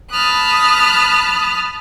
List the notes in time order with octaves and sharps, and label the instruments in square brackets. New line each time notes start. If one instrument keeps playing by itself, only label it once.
[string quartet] A5 B5 D#6 F6 F#6